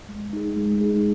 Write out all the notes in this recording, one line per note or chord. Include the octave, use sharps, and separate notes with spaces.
G#3
D#4 G#4
G#3
D#4 G#4